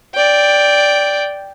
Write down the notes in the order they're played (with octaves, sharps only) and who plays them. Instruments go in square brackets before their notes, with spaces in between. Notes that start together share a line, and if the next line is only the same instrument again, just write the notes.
[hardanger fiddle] D5 G5